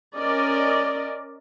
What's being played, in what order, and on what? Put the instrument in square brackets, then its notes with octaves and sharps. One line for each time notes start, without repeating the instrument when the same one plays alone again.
[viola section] C#4 A#4 D5 D#5